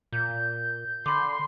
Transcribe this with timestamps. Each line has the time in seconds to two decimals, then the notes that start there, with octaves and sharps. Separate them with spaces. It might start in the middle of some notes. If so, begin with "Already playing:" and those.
0.12 A#2 G6
1.06 D3 B5 C6 D6